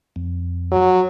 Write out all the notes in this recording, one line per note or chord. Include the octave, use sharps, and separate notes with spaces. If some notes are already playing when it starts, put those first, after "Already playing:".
F2
F#3